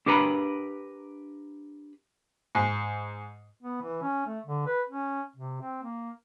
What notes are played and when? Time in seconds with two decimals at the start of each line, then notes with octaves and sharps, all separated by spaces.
0.06 D4 G4 A#4 B4 A#5 B5
2.55 G#2
3.61 B3
3.81 E3
4.02 C#4
4.27 A3
4.46 D3
4.67 B4
4.89 C#4
5.36 C3
5.61 C4
5.83 A#3